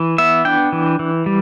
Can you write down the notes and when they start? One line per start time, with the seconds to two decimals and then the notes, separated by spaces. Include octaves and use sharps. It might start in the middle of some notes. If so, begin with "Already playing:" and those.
Already playing: E3
0.18 B3 E5
0.45 D4 G5
0.72 E3
0.99 E3
1.26 G3